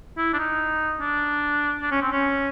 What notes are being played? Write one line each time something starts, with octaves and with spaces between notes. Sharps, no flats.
E4
D4
D#4
D4
D4
C#4
C4
C#4